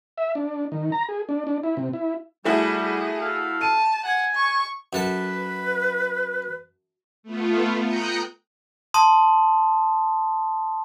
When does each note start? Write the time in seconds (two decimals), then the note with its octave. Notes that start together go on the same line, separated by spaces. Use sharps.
0.18 E5
0.35 D4
0.72 D#3
0.92 A#5
1.09 G#4
1.29 D4
1.47 D4
1.64 E4
1.77 C3
1.93 E4
2.45 G3 A3 E4 F#4 G#4
2.84 G#4
3.22 A4 F5
3.61 A5 D#7
4.06 F#5 G#5
4.35 C#6
4.93 F#2 A4 B4 A5
7.23 A3 B3 F4
7.85 G5 A#5 D#6 F#6 G6 C#7
8.94 A5 C6 D#6